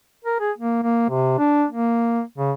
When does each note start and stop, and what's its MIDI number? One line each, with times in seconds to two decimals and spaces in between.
0.25 0.39 70
0.40 0.51 68
0.58 0.82 58
0.83 1.09 58
1.10 1.37 48
1.38 1.65 62
1.70 2.22 58
2.38 2.52 49